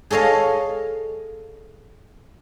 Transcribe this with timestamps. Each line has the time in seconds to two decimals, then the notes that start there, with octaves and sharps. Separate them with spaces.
0.10 G#4 A4 C#5 D#5 F5